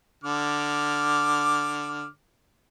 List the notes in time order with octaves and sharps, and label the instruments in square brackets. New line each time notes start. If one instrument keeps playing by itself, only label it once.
[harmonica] D3 D6 F6